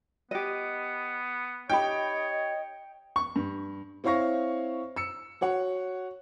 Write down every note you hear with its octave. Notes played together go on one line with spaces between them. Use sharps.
B3 G4 D#5
D#4 G4 C#5 D#5 G5 B5
C#6
G2
C4 E4 C#5 F5 C#6 A#6
E6 C#7
F#4 C#5 F#5